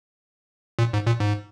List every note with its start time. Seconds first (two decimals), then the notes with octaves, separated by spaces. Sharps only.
0.79 A#2
0.93 G#2
1.07 A#2
1.20 G#2